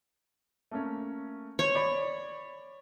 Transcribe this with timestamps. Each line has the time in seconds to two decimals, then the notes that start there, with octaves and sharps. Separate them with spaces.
0.71 A3 A#3 C#4
1.59 C5 C#5
1.75 D5 B5